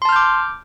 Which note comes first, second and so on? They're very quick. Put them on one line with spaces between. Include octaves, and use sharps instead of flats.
C6 A5 F6 G6 D6